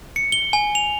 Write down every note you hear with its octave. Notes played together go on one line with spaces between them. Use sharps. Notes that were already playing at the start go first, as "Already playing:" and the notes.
C#7
G7
G#5
F7